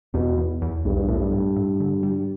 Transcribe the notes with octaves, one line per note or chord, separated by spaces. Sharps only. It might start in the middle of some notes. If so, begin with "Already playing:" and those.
E2 B2
E2
E2
B1 G2
G2
B1 A2
G2
A2
A2
D3
G3